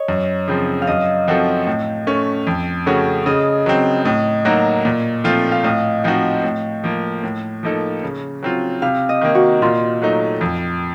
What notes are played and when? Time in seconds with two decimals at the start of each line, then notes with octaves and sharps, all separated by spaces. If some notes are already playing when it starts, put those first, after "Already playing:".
Already playing: C#5 D#5
0.08 F#2
0.48 C#3 F3 C4
0.82 F5
0.87 F#2 D#5
1.28 F3 C4 F#4 A4
1.67 A2
2.07 A3 C#4
2.47 F2
2.86 C#3 A3 C#4 F#4
3.26 C#3 D#5
3.66 F#3 C4
4.05 A2 D#5
4.45 F#3 A#3 D#4 F#4
4.85 A#2
5.24 F3 A3 C4 F4
5.52 F5
5.64 A2 D#5
6.04 F3 C4 D#4 F#4
6.44 A2
6.84 F3 A#3
7.23 A2
7.63 F3 A#3 D#4 A4
8.03 C#3
8.43 F#3 C4 F4
8.82 C3 F5
9.09 D#5
9.21 D#3 A#3
9.35 F#4
9.62 A#2 F4
10.02 F#3 A3 D#4
10.41 F2